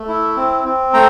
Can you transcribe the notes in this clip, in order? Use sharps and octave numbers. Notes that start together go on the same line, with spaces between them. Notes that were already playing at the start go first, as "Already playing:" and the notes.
Already playing: A3
E4
C4
C4
A3 G5 A#5